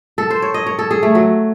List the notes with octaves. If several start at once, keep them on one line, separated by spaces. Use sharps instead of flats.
A4
C5
C#5
D#5
C#5
A4
G#4
A3
F#3